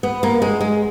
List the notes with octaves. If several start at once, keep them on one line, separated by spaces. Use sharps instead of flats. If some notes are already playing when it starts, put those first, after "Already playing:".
B3
A#3
G#3
G#3